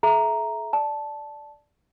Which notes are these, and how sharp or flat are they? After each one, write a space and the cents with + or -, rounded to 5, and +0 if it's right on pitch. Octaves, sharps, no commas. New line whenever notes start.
A4 -40 E5 +0 A#5 +0
D5 +0 A5 -5